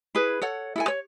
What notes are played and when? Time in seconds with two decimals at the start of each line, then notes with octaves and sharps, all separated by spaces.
0.15 E4 G#4 B4
0.42 A4 C#5 F#5
0.76 E4 A4 G#5
0.88 C#5